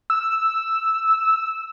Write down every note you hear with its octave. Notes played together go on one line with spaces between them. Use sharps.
E6